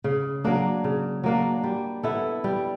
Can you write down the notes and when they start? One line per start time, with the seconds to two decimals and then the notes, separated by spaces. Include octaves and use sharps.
0.04 C#3
0.44 F#3 A#3 D4
0.84 C#3
1.24 F#3 A#3 D4
1.64 G3
2.03 B3 E4 A4
2.44 G3